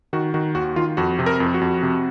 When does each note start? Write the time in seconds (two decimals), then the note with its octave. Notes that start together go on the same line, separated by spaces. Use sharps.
0.13 D#3 F#4
0.34 D#3 F#4
0.55 D#2 F#4
0.76 D#3 F4
0.97 F2 F#4
1.19 C3
1.26 A#4
1.40 F2
1.54 F#4
1.61 F2
1.83 C3